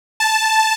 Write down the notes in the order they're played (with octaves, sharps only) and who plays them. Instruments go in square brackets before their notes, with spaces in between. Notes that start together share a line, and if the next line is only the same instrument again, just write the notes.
[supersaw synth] A5